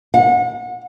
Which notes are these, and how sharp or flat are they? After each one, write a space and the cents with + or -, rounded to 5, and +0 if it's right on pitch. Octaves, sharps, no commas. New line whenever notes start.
F#5 -35